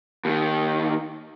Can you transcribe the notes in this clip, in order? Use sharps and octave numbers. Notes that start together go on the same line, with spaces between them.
D#2 D#3